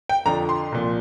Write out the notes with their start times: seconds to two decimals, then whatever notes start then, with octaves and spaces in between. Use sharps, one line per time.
0.09 G5
0.26 F2 D3 F3 A#5
0.49 C6
0.72 C2 A#2 F3